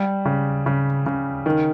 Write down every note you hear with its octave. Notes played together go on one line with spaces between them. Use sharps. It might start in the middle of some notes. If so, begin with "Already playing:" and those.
Already playing: G3
C#3
C#3
C#3
D#3